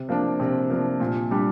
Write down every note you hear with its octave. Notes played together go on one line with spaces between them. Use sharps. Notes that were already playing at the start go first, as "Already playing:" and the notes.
Already playing: C3
F3 A#3 D4
C3
F3 A#3 D4
A#2
G3 D4 G4